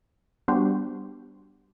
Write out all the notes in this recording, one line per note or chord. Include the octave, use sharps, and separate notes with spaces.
G3 B3 D4 F#4 G4 C5